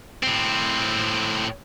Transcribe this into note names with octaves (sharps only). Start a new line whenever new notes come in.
A2 C4